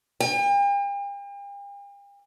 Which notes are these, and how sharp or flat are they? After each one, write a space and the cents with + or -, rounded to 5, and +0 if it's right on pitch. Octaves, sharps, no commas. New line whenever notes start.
G5 +45